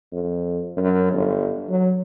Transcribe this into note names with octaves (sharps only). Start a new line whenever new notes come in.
F2
F#2
G1
F#3